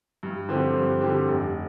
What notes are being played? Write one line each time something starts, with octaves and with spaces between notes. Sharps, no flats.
G2
D3 F3 C4 G4
G2
D3 F3 C4 G4
F1